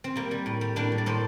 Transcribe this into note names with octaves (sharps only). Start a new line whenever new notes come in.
C4
G3 A#3
G3
A2
G3
A2 A#3 D4
G3
D5
A2 A4 C5